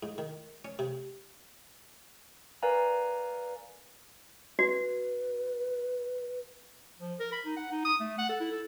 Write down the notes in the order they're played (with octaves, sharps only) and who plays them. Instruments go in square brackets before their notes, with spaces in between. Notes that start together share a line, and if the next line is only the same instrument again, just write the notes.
[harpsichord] G#2
D#3
C#4
C3
[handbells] A#4 B4 D5 F5 G#5 A#5
[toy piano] F#4 [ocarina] B4
[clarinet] F3
A#4
B5
D#4
F#5
D#4
D#6
A3
F#5
A4
E4
A4